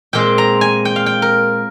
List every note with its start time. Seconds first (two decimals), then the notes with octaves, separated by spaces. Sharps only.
0.13 A#2 G#3 C4 G5
0.38 A#5
0.61 G#5
0.85 G5
0.96 F5
1.06 G5
1.22 A#4